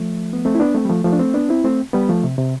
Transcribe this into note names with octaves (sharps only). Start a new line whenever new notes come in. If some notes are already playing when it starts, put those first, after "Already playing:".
Already playing: F3 A3
B3
A3 C4
E4
B3 D4
A3 C4
G3
F3 A3
F3 A3
D4
A3 C4
B3 D4
C4 E4
A3 C4
G3 B3
F3 A3
C3
C3